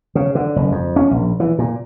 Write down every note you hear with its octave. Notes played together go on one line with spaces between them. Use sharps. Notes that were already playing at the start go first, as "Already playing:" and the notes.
C#3
D3
F#1
F2
C#4
A#1
E3
A#2